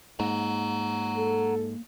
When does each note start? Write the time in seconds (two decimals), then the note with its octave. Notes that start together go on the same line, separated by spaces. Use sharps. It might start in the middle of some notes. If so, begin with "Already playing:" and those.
0.20 G#2 A#3 F#5 A#5
1.17 A4